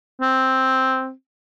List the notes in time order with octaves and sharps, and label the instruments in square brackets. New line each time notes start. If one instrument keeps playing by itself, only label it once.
[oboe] C4